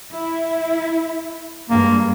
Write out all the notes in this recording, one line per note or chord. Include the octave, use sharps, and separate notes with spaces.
E4
G2 G#3 A#3